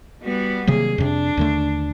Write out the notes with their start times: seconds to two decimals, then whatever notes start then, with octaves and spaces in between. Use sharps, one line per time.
0.23 G3 B3 F#4
0.67 C3 D#3 F#3 A#3 G#4
0.98 F2 C3 D4
1.37 D#2 D3 A3